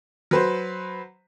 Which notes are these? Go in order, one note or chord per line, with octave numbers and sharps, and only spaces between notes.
F#3 B4 C5